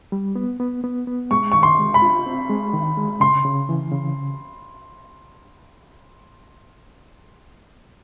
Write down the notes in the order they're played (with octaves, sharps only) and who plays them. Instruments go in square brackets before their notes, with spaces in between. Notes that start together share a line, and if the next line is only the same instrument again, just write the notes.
[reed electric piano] G3
B3
B3
B3
B3
[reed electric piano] G#3 [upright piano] C#6
[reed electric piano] D#3 [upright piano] C#6
[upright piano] C6
[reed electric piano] G#3
[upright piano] B5
[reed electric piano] F4
C4
G#3
D#3
G#3
[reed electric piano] C#3 [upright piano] C6
[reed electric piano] C#3
E3
C#3